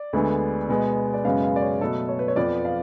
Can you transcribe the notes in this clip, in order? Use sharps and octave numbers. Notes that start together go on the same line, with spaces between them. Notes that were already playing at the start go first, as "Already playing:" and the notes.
Already playing: D5
D2 D3 G#3 B3
B2 G#3 B3
D5
F#2 C#3 G#3 B3 F5
F5
D5
C#5
B2 F#3 A3 A4
C#5
B4
C#5
F2 F3 B3 D5
F5